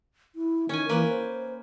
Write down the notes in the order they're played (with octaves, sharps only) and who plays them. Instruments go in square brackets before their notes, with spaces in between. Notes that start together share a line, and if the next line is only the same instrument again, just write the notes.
[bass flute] E4
[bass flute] D#3 [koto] C#4 G#5
[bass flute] E3 [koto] A#3 B4
[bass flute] C5